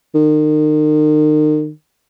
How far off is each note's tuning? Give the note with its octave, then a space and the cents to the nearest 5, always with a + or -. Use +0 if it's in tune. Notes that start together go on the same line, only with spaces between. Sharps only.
D#3 -35